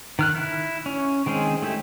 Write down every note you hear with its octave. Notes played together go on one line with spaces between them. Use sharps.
D#3 F6 F#6
E4
C#4
D#3 G#3 C4 C#4 G#4
A3 E4 G4